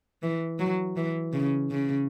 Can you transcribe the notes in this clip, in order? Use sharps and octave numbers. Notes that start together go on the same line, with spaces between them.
E3
F#3
E3
C#3
C#3